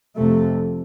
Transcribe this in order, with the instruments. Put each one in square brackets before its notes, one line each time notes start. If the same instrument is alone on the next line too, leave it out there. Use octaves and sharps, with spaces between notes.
[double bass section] F2 C3 A3